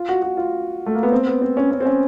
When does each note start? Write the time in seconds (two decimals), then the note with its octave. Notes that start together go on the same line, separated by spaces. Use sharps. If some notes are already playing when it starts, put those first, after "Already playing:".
Already playing: F4
0.09 F#4
0.22 F#4
0.37 F4
0.86 A3
0.95 A#3
1.03 B3
1.12 C4
1.27 B3
1.42 C4
1.57 C#4
1.71 C#4
1.80 C4
1.86 C#4